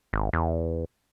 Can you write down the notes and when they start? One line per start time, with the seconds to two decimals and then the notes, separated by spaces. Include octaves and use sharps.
0.13 G#1
0.33 E2